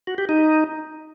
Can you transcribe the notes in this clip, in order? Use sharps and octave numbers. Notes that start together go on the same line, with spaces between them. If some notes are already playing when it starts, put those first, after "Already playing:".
F#4
G4
D#4